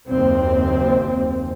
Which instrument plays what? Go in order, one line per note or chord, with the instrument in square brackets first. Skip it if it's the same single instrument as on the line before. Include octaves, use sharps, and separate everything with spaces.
[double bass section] F#1 D#2 C4